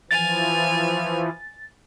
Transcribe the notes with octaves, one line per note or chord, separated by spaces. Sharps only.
E3 F3 G#5 F6 A6